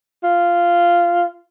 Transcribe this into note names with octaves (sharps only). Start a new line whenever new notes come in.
F4